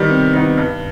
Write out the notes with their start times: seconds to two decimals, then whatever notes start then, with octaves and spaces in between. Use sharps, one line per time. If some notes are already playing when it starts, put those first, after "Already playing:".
Already playing: D#3 G3 B3 D#4
0.09 C3
0.33 D#3 G3 B3 D#4
0.58 G2